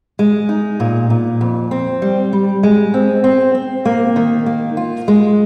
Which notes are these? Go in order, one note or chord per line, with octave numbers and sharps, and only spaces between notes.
G#3
D#4
A#2
A#2
F2
C4
G3
G3
G#3
C4
C4
C4
A#3
D#3
A#3
F4
G#3